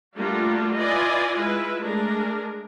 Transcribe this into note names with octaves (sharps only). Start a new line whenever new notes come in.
G3 A3 A#3 D4 F4 F#4
E4 F4 B4 D5 D#5 G#5
G#3 E4 F4 B4
G#3 A3 D4 G#4 A#4